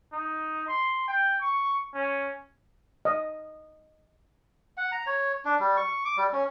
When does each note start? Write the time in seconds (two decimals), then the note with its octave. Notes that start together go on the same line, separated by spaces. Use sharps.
0.12 D#4
0.68 C6
1.08 G5
1.41 C#6
1.94 C#4
3.05 D#5
4.77 F#5
4.92 A#5
5.07 C#5
5.45 D4
5.60 G3
5.77 C#6
6.05 D6
6.17 G3
6.33 C#4